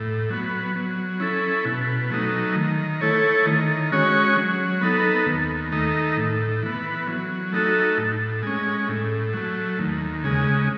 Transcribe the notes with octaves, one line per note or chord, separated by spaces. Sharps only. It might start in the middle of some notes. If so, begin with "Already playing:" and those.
Already playing: A2
F#3 B3
F#3
C#4 E4 A4
B2
F#3 A3 D#4
D#3
A3 E4 A4 C#5
D#3
G#3 C#4 F#4 C#5
F#3
B3 D#4 A4
D#2
D#3 A3 D#4
A2
E3 B3
F#3
A3 D#4 F#4 A4
A2
G#3 C#4
A2
F#3 A3
D#2
C#3 G#3